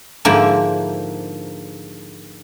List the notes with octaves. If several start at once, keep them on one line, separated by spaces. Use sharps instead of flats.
G#2 D3 F3 A#3 E4